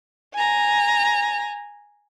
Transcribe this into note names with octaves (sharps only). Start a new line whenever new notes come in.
G#5 A#5